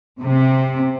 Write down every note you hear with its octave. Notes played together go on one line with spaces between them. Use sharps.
C3